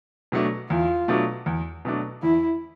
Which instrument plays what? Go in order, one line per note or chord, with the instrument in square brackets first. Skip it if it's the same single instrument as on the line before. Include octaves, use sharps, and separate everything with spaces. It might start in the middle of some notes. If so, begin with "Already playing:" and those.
[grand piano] B2 F#3 A3 D4
[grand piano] E2 [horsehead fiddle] F4
[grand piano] B2 F#3 A3 D4
E2
B2 F#3 A3 D4
[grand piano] E2 [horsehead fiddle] E4